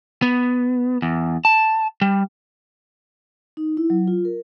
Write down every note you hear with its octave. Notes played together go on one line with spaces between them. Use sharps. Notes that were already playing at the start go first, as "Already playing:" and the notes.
B3
E2
A5
G3
D#4
E4
F#3
F4
A#4